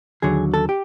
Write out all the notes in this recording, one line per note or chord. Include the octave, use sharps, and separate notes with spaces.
D#2 D3 F#3 G#4
A4
G4